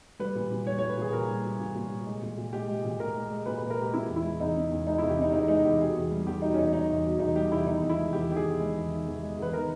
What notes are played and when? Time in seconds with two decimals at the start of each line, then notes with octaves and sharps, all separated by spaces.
0.19 G3 B4
0.35 A#2
0.51 A#2
0.66 G3 C#5
0.78 C#5
0.82 G3
0.89 B4
0.97 A#2 G#4
1.13 A#2 A#4
1.28 G3
1.44 G3
1.60 A#2
1.75 A#2
1.90 G3
2.06 G#3
2.22 A#2
2.37 A#2
2.53 G#3 G4
2.69 G#3
2.85 A#2
3.00 A#2 A#4
3.16 G#3
3.31 G#3
3.46 A#2 B4
3.58 B4
3.62 A#2
3.70 A#4
3.78 G#3 G4
3.93 C#3 E4
4.08 E2
4.16 E4
4.24 G#3
4.40 E2 D#4
4.56 C#3
4.71 E2
4.87 G#3 D#4
4.98 E4
5.02 E2
5.09 G4
5.18 C#3 D#4
5.33 E2 D#4
5.48 G#3 D#4
5.64 E2 G4
5.80 B2 G#4
5.95 E2
6.11 G3
6.27 E2 G4
6.42 B2 D#4
6.54 C#4
6.58 E2 D#4
6.73 G3 D#4
6.89 E2
7.05 B2
7.19 E2 D#4
7.35 G3 G4
7.51 E2 E4
7.67 D#3 D#4
7.82 E2
7.89 E4
7.98 G#3
8.13 E2 G4
8.29 D#3 G4
8.36 G#4
8.45 E2
8.60 G#3
8.76 E2
8.91 D#3
9.07 E2
9.22 G#3
9.38 E2 B4
9.53 D#3 A#4